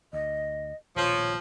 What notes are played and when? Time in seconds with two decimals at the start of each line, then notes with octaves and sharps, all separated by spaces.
0.13 D2 D#5
0.96 D#1 A#1 B2 F3 C#5